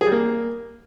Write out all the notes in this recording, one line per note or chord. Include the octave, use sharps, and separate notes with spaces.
G#4
G3
A#3